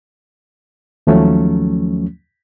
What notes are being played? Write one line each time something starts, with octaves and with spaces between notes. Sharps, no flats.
D#2 F3 F#3 A3 C#4